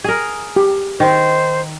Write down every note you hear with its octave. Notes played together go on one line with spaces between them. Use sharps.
G#4 A#4
G4
D#3 C5